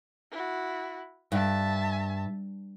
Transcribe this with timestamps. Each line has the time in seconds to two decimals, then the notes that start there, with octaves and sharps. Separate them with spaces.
0.31 E4 F#4
1.32 G2 E5 A5